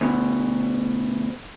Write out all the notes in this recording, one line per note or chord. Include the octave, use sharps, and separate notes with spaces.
D2 B2